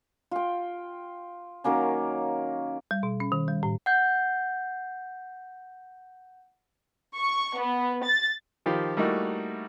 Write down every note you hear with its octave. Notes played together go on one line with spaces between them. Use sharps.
F4 G5
D#3 F#3 A#3 C#4
G3
B2
C#4
D#3
G3
A2
F#5 G6
C#6
B3
A6
D#3 F3 G4 F5 B5
G3 A3 A#3 D#4 E4 F#4